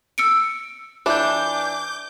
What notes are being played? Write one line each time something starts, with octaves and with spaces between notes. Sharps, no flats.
E6 C#7 D7
E3 D4 D6 G6